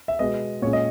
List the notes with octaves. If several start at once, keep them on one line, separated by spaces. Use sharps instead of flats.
E5
B2 G#3 B3 D#5
A#2 G#3 C#4 C#5
D#5